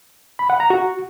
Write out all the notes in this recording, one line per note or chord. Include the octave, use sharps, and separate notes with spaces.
B5
F#5
A#5
F#4